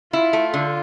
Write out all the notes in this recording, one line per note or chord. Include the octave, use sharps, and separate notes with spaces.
E4 F4
A3
D3